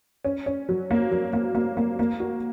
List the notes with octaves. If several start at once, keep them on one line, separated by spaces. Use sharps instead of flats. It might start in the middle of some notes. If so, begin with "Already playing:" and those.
C#4
C#4
F#3
A#3
F#3
A#3
A#3
A#3
A#3
F#4